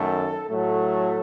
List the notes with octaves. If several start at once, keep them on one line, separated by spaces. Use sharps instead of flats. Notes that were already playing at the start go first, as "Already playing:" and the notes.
Already playing: F#2 D#3 A3 A4
A2 F#3 A3 A4